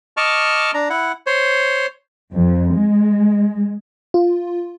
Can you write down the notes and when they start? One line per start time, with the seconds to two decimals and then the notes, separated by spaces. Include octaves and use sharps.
0.17 D#5 A5 C#6 D6 F6
0.74 D4 A#5
0.90 E4 F#5
1.26 C5 C#5
2.33 F2
2.75 G#3
4.14 F4